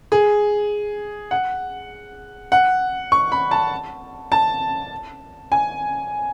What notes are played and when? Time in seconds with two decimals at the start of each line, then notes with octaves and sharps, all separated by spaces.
0.12 G#4
1.31 F#5
2.52 F#5
3.12 C#6
3.32 B5
3.51 A5
4.32 A5
5.52 G#5